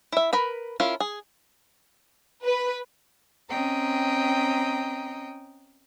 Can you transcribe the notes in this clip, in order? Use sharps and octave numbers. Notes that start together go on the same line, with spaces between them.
E4 E5
A#4 B4 B5
C#4 E4 F4 A#4
G#4
B4
C4 C#4 D#5 G5 A#5